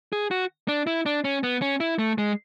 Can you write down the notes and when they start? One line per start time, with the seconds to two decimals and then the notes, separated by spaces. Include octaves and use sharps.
0.13 G#4
0.31 F#4
0.68 D4
0.87 E4
1.06 D4
1.24 C#4
1.43 B3
1.62 C#4
1.80 E4
1.99 A3
2.18 G#3